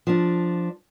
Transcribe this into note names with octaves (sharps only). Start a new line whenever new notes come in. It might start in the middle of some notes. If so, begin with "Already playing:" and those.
F3 D4